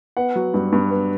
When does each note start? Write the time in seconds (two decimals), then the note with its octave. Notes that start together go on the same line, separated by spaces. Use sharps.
0.17 B3 F#5
0.36 F#3
0.54 G2
0.73 G2
0.91 B3